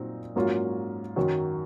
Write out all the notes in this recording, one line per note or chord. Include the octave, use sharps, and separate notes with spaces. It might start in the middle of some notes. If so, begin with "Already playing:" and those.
Already playing: A#2 F#3 C4 D#4
G#2 F#3 A#3 C#4 F4
F#2 D#3 F#3